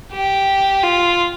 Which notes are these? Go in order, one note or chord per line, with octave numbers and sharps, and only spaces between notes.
G4
F4